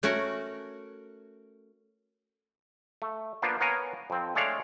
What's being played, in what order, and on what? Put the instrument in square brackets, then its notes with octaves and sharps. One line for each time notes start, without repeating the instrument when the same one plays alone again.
[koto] A3 C#4 F#4 A#4 F#5
[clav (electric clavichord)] A3
A#3 B3 D4 F4 C5
B3 A#4 C#5 F5 G#5 A#5
F2 C4
G#3 A3 D4 C#5 D5 F5